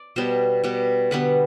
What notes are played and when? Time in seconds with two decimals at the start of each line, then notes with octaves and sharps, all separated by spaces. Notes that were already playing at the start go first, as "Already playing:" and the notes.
Already playing: D5
0.16 B2 G3 B3 C5
0.64 B2 G3 B3
1.11 D3 G3 B3 B4